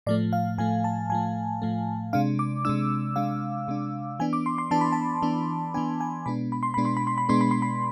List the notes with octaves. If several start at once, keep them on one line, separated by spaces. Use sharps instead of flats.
A2 F3 A3 D5
F5
A2 F3 A3 G#5
A5
A2 F3 A3 G#5
A2 F3 A3
C3 G#3 D4 F5
D6
C3 G#3 D4 E6
C3 G#3 D4 F5
C3 G#3 D4
E3 B3 D4 G#5
D6
C6
C6
E3 B3 D4 A5
B5
A5
E3 B3 D4
E3 B3 D4 G#5
G#5
B2 G#3 B3 D4 B5
B5
C6
B2 G#3 B3 D4 B5
C6
B5
C6
B5
B2 G#3 B3 D4 C6
B5
C6
B5